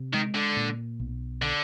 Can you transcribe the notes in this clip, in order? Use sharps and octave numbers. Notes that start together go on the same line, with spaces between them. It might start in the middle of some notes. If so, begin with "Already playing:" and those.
Already playing: C3
D#3 G#3
D3
A#2
B1
D3